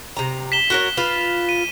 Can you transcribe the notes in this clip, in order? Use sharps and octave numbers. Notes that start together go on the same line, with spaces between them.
C3 A#5
B6 E7 G7
F#4 A#4 C#5
F4 B4 F5
D#7